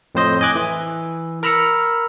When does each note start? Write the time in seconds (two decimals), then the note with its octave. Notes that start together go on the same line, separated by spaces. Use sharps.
0.15 F2 A2 C5 D#5
0.41 D#5 G#5 D6 F#6 G#6
0.55 E3
1.43 A#4 A#5 B5 E6 F6 C#7